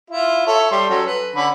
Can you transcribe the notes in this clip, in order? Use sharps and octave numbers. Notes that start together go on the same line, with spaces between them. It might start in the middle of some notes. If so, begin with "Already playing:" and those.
E4 F4
A4 C#5 E5
G3 C6
F#3 C#4 A4
B4
D3 C#4 B5